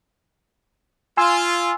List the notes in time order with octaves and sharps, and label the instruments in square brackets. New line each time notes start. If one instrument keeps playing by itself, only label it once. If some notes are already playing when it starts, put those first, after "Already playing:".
[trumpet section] F4 [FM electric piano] G#5 C6 E6